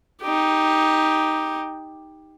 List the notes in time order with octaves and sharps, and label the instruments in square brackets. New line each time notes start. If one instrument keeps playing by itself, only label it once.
[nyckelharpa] D#4 G4